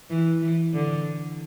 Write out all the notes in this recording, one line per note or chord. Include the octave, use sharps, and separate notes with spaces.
E3
E3
D3